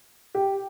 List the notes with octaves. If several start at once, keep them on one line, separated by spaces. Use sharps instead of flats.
G4